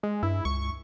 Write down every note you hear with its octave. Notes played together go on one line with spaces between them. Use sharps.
G#3
G2 E4
C#2 C#6